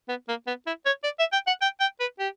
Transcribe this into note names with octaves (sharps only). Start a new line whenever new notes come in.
B3
A#3
B3
E4
C#5
D5
E5
G5
F#5
G5
G5
B4
G4